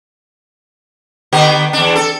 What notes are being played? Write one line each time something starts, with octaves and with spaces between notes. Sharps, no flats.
D3 B3 G4
E2 D4
A4